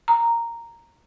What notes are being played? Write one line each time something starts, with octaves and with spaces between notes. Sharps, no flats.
A#5